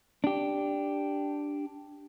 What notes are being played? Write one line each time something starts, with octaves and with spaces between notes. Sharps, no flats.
D4 G4